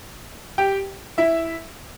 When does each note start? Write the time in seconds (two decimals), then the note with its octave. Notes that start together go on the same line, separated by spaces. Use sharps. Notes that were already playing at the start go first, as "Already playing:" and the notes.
0.58 G4 G5
1.18 E4 E5